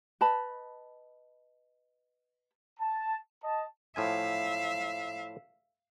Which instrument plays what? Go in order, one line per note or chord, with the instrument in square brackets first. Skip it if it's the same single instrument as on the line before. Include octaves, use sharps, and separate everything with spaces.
[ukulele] B4 D#5 A5 B5
[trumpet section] A5
D#5 A5
[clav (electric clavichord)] A2 F3 G#5 [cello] E5 F5